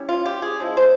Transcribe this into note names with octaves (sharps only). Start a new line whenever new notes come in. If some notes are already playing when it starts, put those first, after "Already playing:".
Already playing: G3 C#4 E4
F4
G4
G#4
C#3 F3 G#3 E4
C5